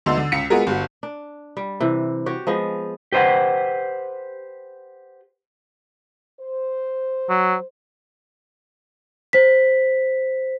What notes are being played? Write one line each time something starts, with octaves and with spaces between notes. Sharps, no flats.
D2 D3 B3 D#4 C6 E6
D3
C#2 B6 C#7
G#3 B3 F4 F#4 G#4 A#4
G1 F#4
D4
G3
C3 E3
F#4 G4 C#5
F3 G#3 B3
G4 B4 C5 E5 F#5
C5
F#3
C5 B6